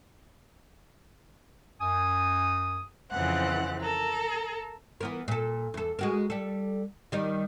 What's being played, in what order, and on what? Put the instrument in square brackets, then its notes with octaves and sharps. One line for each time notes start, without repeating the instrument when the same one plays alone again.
[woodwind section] F#2 G#5 D#6
[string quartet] F2 C#3 E3 C4 F#5 F#6
A4 A#4
[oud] E3 B3 A#4
A#2 A4
E2 A4
G#3 F#4 A#4
G3 A4
D#3 G3 D#4